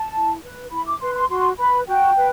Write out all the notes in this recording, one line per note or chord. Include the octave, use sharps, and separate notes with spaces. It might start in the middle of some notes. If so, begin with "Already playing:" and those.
Already playing: A5
E4
B4
E4 B5
D6
B4 C6
C6
F#4 C6
B4 B5
F#4 G5
B4